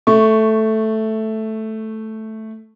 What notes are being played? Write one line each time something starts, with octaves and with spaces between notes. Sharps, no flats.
A3 C#6